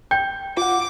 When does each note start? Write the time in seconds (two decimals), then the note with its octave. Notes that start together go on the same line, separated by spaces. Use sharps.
0.11 G5 G6
0.57 F4 F#5 D6